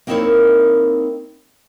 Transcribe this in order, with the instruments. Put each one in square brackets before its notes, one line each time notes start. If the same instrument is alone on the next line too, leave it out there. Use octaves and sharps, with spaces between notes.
[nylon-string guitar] A#3 C4 D#4 E4 A#4 C#5